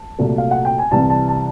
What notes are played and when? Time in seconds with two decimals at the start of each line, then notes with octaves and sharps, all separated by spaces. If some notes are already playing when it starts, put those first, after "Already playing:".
Already playing: A5
0.19 C2 A#2 F#3 A3
0.38 F5
0.51 F#5
0.65 G5
0.78 G#5
0.91 C2 C3 E3 G3 A5
1.10 A5
1.28 A5